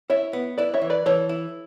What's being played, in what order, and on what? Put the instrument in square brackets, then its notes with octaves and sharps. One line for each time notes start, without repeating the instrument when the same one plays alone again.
[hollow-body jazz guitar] E4 [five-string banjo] C#5 E5
[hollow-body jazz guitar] B3
[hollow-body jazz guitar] E4 [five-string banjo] B4 D5
[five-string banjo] C#5 E5
[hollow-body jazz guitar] E3
[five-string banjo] B4 D5
[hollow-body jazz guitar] E3 [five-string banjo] A4 C#5
[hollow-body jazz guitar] E4